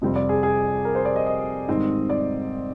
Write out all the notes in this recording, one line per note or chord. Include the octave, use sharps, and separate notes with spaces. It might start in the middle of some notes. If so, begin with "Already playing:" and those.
F2 C3 G3 C4
D5
G#4
G#4
A#4
C5
D5
D#5
D#5
G#2 D#3 G3 C4
D5